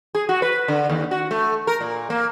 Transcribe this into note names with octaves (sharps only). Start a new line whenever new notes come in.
G#4
F#4
B4
D3
D#2
F#4
A3
A#4
A#2
A#3